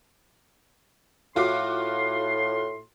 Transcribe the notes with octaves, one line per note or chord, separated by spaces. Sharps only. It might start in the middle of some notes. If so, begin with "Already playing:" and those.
A2 F4 F#4 C6 D6